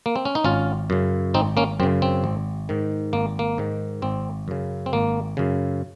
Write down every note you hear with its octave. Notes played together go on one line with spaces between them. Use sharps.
A#3
C4
C#4
D#4
G#1 C#4 F4
F#2 C#3
G#1 C4 D#4
A#3 C#4
F#2 C#3 C4
C4
G#1
G#2 D#3
G#1 A#3
A#3
G#2 D#3
G#1 C4
F#2 C#3
C4
G#1 A#3
F#2 C#3